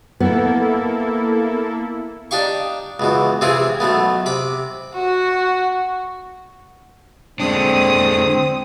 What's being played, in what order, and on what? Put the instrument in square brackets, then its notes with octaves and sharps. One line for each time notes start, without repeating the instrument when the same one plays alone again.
[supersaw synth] A#3 E4 A4 [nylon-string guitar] B3
[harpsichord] D4 D#4 G4 F5 C#6
C#2 B2 E3
C3 E3 C4 E4 F4 G#4
B1 B2 A3 B3
C3 B5 D6
[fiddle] F#4
[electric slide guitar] D3 G#3 D4 [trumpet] C4 [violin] D#6